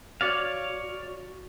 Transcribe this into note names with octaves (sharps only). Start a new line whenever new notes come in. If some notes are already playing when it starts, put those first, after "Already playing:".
F#4 C#5 D5 F5